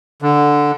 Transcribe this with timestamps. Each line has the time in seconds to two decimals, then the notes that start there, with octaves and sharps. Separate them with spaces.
0.22 D3